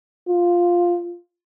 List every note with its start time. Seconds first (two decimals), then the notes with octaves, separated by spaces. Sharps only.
0.29 F4